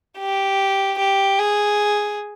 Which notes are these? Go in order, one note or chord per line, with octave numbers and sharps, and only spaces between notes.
G4
G4
G#4